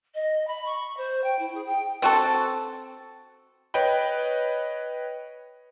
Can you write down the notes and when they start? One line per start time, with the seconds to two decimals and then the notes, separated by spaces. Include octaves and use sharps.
0.15 D#5
0.47 B5
0.66 C#6
0.97 C5
1.24 G5
1.39 E4
1.55 G#4
1.66 G5
2.02 C4 F#4 A4
3.74 B4 C#5 D#5 G5 B5